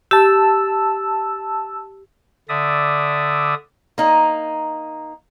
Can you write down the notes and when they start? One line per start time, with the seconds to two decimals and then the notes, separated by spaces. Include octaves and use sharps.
0.11 G4 A5 E6
2.49 D3 D5 E5 D#6
3.98 A#3 D#4